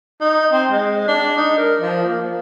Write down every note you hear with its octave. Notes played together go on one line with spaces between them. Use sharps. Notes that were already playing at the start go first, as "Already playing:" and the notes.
D#4
C4
G#3
D4
D#4
A#4
F3
A#3